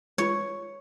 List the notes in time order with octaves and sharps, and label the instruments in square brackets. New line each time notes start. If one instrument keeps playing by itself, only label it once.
[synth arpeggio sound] G#3 F4 B4 [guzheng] C#5